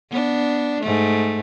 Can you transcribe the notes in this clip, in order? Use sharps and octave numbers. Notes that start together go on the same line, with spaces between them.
B3 D4
G#2 A3